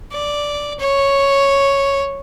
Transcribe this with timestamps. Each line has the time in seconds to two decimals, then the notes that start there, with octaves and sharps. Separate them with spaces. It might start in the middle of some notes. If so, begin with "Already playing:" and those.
0.12 D5
0.80 C#5